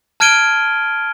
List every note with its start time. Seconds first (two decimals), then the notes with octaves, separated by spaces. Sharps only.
0.20 A5 F6 G#6 D7 D#7 G7